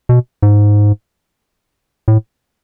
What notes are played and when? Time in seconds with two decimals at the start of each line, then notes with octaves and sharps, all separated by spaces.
0.09 B2
0.43 G#2
2.08 A2